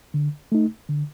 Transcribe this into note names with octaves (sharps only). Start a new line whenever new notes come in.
D3
A3 D#4
D3